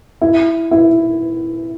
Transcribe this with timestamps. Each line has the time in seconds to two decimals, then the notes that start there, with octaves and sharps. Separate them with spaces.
0.22 E4
0.71 E4